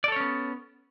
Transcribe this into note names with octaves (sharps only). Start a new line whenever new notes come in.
B3 C#4 A4 C#5 D5